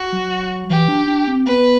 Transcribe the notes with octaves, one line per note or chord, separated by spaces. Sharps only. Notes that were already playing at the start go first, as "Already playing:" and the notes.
Already playing: F#4
F#3
E3 G4
D4
D4
C4
B3 B4